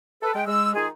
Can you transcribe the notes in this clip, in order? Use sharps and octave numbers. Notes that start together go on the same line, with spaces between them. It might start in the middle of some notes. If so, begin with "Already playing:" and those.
A4 B4
G#3 G5
G#3 E6
D#3 G#3 D#4 F4 G#4